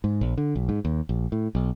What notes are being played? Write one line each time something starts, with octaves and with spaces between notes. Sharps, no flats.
G#2
A#1
D3
B1
G#2
D#2
A#1
A2
B1